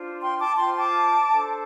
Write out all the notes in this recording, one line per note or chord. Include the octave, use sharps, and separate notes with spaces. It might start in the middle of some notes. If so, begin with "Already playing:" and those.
Already playing: D4 F4 C5
G5 C6
A5 D6
F4 C5 G5 C6
A5 D6
D4 A4 C5